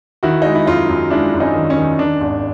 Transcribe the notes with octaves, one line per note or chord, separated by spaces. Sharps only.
D#3 E4 F#4
G#3 D#4
E4
F#2 D#4 F4
F#2
G#3 D4 E4
F#2
C#4 D#4
D#3
C#4
D#3
D#3 D4
G#1 D4